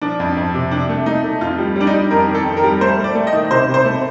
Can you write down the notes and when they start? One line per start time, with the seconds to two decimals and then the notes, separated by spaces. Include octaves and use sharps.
0.02 F3 D4
0.20 F2
0.37 F2
0.54 C3
0.71 C3 D4
0.89 A3
1.06 A3 D#4
1.24 A3
1.41 F2 F4
1.58 G3
1.76 G3 D4
1.87 D#4
1.94 G3
2.11 F2 A#4
2.28 D#3
2.34 A4
2.46 F2
2.57 A#4
2.64 G3
2.81 A3 C5
2.98 A3
3.04 D5
3.15 A3
3.27 D#5
3.33 D#3
3.50 C3 C5
3.68 C3
3.74 C5
3.85 A3